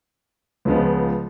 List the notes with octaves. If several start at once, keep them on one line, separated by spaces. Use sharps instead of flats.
C#2 C#3 F3 G#3 B3